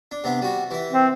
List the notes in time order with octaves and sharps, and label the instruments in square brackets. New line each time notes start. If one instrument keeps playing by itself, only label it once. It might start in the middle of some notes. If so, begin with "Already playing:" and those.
[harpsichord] D4
C3 B3 D4
G3 F#4
E3 E4
[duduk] C4